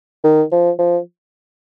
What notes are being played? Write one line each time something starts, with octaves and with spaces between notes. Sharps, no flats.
D#3
F3
F3